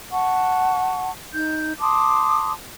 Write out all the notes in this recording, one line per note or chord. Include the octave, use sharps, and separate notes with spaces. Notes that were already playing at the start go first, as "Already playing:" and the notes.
F#5 A5 C#6
D#4 G6
A5 C6 D6 D#6